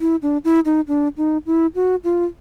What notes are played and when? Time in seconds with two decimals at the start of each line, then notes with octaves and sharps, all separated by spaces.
0.01 E4
0.22 D4
0.45 E4
0.65 D#4
0.88 D4
1.17 D#4
1.46 E4
1.75 F#4
2.04 F4